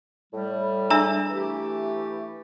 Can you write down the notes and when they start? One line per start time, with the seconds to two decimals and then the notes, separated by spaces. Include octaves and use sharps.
0.33 A2 G3
0.90 D4 G#4 E5 A#5 E6
1.30 E3 A3 G4